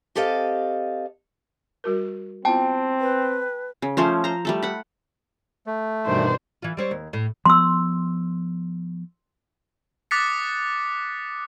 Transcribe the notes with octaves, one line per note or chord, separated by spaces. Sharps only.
C4 G4 A4 D#5 F5
G3 F#4 A#4
B3 C4 E4 F4 G5 A5
B4
C#3
F3 A3 C#4 C5
C5 A#5
G3 A3 A4
F#5 B5
A3
G2 B2 D#3 E3 D4 C5
E3 F4
G3 C4 C#5
D#2
A2
F3 B3 C6 E6
D6 D#6 F#6 A6 B6 C#7